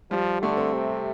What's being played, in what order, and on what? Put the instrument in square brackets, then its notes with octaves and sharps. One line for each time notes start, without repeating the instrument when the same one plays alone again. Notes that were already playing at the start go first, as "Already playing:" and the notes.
[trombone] F3 [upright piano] G3
[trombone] D3 [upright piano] A3
[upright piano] C4
[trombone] C3